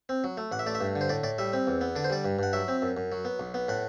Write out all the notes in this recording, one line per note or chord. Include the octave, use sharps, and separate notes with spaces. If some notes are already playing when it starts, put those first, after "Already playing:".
C4
F#3
A3
A1 F#5
E5
A3 D5
E5
G2
D3
C5
A2 D5
A2 D5
G3 E5
C4
E2
B3
D3 D5
C5
G3 D5
G2
G2 F#5
F#3 E5
C4
F#2
F#2
F#3
B3
B1
B3
A2 F#5